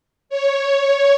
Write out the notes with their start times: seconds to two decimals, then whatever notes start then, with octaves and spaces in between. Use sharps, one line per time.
0.29 C#5